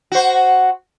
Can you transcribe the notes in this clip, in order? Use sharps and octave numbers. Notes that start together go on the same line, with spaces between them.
F#4 C5